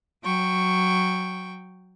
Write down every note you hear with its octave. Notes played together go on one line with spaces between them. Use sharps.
F#3 G5 C#6